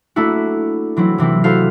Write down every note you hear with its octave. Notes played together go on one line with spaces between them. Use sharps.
A3 A#3 D4 E4 F#4
E3 F#3 C4 E4
C3 E3 C4 E4
E4 F#4 A4 C5 F5